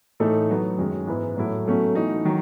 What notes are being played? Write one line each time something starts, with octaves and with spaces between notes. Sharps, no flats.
A2 E3 A3 D#4 A4
B2 F#3 B3
F#2 D#3 G#3 C#4
G#2 E3 B3 E4 B4
A2 F#3 A3 E4
B2 F#3 A3 C#4
E3 A3 D#4 F#4
D#3 F#3